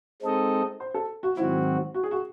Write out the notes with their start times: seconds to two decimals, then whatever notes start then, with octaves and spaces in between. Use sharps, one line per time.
0.22 G#3 C4 D#4 A4 D#5
0.80 C5
0.94 A4
1.23 F#4
1.37 G#2 D#3 F#3 C4 E4 F#4
1.94 F#4
2.03 G#4
2.11 F#4